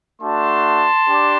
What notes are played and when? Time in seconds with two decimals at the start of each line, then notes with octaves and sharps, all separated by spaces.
0.21 A3 D4 F#4 A5 C6
1.05 D4 G4